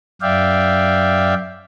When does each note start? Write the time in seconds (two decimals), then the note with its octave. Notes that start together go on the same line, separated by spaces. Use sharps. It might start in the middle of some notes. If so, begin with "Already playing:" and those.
0.22 F#2 D5 E5 F5 G5